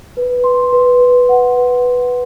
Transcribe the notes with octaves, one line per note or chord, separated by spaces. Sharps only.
B4
C6
B4
B4
F#5
B4
F#5